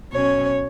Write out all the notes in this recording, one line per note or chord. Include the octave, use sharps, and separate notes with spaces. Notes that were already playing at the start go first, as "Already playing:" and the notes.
B2 F#3 C#4 C#5